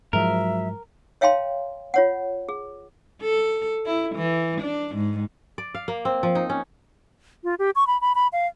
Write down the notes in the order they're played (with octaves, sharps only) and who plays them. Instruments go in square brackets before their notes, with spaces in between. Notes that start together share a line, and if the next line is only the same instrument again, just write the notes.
[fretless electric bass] G#2 F3 [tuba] F#3 [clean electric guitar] A#4 [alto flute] E5
[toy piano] C#5 E5 F5 G5 A5 C6
F4 C#5 F#5
G#4
[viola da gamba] A4
E4
E3
D4
G#2
[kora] D5
F5
A#3
C4
F3
D#4
C#4
[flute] F4
G4
C#6
B5
B5
B5
F5